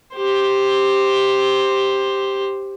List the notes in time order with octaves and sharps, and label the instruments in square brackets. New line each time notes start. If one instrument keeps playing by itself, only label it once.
[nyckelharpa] G4 C5